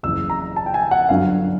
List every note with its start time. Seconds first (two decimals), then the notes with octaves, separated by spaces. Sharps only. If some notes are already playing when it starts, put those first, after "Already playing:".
0.03 F#1 E2 C#3 E3 E6
0.30 A#5
0.56 A5
0.66 G5
0.74 G#5
0.91 F#5
1.09 G1 F#2 D3 F#3 F5